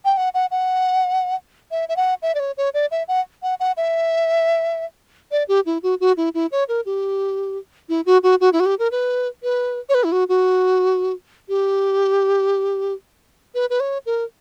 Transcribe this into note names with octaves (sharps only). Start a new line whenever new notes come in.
G5
F#5
F#5
F#5
E5
E5
F#5
E5
D5
C#5
C#5
D5
E5
F#5
F#5
F#5
E5
D5
G4
E4
F#4
F#4
E4
E4
C#5
A#4
G4
E4
F#4
F#4
F#4
E4
F#4
G4
A#4
B4
B4
C#5
B4
E4
F#4
F#4
G4
B4
B4
C#5
A#4